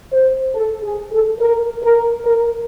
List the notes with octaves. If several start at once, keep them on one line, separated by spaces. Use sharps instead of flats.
C5
A4
G#4
A4
A#4
A#4
A#4